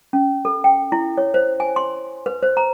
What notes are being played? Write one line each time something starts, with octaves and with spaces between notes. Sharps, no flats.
C#4
A4
G5
E4
C#5
C5
G#5
C6
B4
C5
A#5